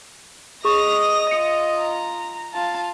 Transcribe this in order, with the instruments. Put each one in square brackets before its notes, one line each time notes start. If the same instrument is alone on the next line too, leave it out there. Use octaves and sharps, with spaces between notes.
[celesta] G#4 C#6 [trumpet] D#5 [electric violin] D#6 [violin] A#6 F7
[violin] F4 [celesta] C#7
[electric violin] A#5
[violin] F4 F5 [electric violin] A5